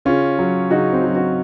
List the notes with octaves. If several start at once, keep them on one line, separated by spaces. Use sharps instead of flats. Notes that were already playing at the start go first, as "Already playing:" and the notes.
C#3 C#4 F4
F#3
C#3 D#4 F#4
C4
F#3
D#4 F#4